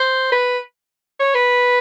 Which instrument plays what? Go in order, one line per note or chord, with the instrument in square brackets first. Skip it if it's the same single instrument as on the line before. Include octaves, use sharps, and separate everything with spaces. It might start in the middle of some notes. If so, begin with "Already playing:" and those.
Already playing: [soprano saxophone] C5
B4
C#5
B4